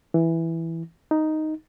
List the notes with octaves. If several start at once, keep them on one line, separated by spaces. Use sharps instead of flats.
E3
D#4